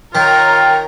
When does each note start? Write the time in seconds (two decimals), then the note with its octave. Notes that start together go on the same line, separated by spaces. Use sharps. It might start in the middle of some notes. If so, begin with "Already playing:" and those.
0.15 D#3 F4 A#4 C#5 G5 A#5